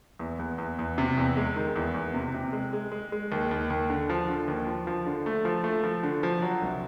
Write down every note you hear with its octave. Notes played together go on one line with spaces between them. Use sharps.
E2
E2
E2
E2
C3
E2
G#3
D#3
E2
E2
C3
C3
G#3
G#3
G#3
G#3
D#2
D#2
D#2
D3
F3
D3
D#2
F3
F3
D3
A3
F3
A3
F3
D3
F3
F#3
C2